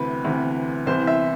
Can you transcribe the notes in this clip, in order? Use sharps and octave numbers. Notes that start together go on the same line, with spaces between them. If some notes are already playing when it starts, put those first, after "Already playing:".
Already playing: D2 C3 E3 B4
D2 C3 E3
C2 C3 E3 C5
E5